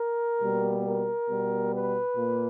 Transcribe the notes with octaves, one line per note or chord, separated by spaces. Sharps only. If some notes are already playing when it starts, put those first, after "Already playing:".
Already playing: A#4
B2 G3 A#3
A#4
B2 G3 B3
B4
A#2 A#3